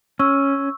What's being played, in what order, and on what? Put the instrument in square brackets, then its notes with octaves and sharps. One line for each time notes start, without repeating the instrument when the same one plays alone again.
[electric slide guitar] C#4 [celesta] C#6 E6